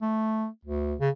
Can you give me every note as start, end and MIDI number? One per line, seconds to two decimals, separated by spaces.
0.02 0.47 57
0.65 0.95 38
1.00 1.10 49